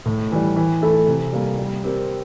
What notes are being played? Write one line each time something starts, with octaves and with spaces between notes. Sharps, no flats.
A2
E3 G3
E3
A3 E4 A4
C3
G3 A#3
G3
C4 G4 A#4